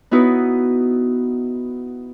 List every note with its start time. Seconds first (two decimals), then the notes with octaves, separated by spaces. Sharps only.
0.11 B3 D#4 E4 F#4 B4